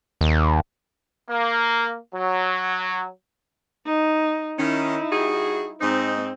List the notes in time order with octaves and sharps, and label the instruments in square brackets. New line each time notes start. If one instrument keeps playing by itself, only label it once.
[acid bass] D#2
[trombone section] A#3
F#3
[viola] D#4
[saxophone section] D#3 C#4 [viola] D#4 E4
[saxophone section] G3 F#4 G#4
[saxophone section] G#2 D#4 [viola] C4